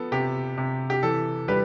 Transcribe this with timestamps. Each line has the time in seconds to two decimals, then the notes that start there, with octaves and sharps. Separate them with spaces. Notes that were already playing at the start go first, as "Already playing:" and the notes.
Already playing: F3 B3 A4
0.12 C3 G4
0.58 C3
0.90 G4
1.03 E3 A4
1.48 G3 G4 B4